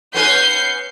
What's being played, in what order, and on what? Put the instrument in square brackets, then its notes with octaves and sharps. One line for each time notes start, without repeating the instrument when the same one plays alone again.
[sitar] B3 C#4 B4 [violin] G6 C7